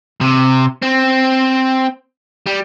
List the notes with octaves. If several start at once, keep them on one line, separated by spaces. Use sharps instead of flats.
C3
C4
G3